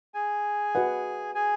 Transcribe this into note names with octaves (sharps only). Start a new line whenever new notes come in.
G#4 G#5
F#4 B4 D#5 F#5
G#4 G#5